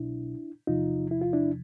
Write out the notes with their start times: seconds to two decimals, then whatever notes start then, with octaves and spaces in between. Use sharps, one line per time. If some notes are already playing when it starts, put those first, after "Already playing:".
Already playing: C2 B2 F#3 D4 E4
0.67 E2 C3 F3 D#4 F4
1.11 E4
1.22 F4
1.33 D4 E4